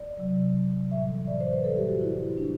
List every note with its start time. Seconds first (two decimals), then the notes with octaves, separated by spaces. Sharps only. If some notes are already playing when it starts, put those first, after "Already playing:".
Already playing: D5
0.18 C3 F#3
0.91 A2 E3 G3 E5
1.27 D5
1.40 C5
1.52 B4
1.64 A2 G3 A4
1.76 G4
1.89 F#4
2.01 E4
2.37 A2 E3 G3 D4